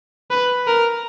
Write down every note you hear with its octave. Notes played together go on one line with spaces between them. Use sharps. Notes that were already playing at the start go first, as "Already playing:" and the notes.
B4
A#4